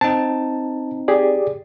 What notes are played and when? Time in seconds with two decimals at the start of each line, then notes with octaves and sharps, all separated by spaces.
0.01 C4 D#4 A5
1.08 G4 G#4 D5